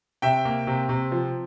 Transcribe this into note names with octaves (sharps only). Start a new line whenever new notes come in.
C3 E5 G5
A#3
C3
C3
F3